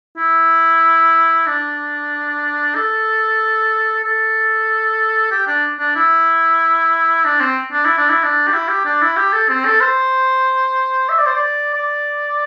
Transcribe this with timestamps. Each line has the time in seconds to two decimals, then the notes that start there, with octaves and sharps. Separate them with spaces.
0.17 E4
1.46 D4
2.75 A4
4.03 A4
5.31 G4
5.47 D4
5.79 D4
5.96 E4
7.25 D4
7.41 C4
7.72 D4
7.84 E4
7.98 D4
8.09 E4
8.23 D4
8.48 G4
8.53 E4
8.68 G4
8.85 D4
9.02 E4
9.17 G4
9.33 A4
9.49 C4
9.65 A4
9.81 C5
11.09 E5
11.18 D5
11.27 C5
11.35 D5
11.74 D5